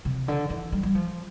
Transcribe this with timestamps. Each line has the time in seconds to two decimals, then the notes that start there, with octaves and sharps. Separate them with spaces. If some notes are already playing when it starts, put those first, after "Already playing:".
0.05 C3
0.28 D3
0.50 E3
0.72 G3
0.83 G3
0.95 F3